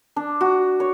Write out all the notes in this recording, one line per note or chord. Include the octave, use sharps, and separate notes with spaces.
D4
F#4
C#5